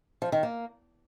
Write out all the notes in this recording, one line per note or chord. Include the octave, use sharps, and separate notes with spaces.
F3
D#3
A#3